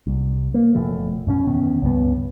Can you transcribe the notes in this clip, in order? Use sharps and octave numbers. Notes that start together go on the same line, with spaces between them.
C2
A#3
F#1 B2 F3 A3
F#2 B2 C#4
E2 D#3 B3 C#4
C#2 G2 B3